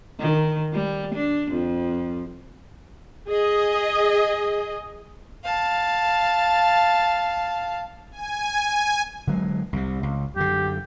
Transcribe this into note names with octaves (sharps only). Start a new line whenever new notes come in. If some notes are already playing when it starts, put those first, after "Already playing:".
D#3
G3
D4
F2
G#4 D#5
F5 A5
G#5
G#5
D3 F#3 G#3
C2 C3
C#2
F#2 D3 G4